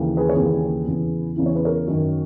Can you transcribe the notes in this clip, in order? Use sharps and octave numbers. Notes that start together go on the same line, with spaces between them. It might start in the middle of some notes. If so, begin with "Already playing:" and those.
Already playing: D#2 C#3 E3
G#4 B4
C#5
D#2 C#3 E3 G#4 B4
E2 C#3 E3
E2 C#3 E3
C#5
B4
A#4 C#5
F#2 D#3